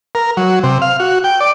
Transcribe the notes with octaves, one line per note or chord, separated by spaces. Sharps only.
A#4
F#3
C3
F5
F#4
G5
D5